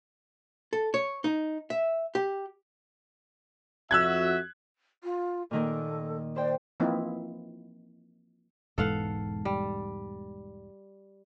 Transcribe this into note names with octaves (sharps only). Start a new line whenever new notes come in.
A4
C#5
D#4
E5
G4
F2 F#4 E5 E6 F#6 G#6
F4
A#2 D#3 A#3 A4
C5 D5 G5
E3 F3 A#3 C4 D#4 E4
E1 G#2 E3 A4 F5 F#5
G3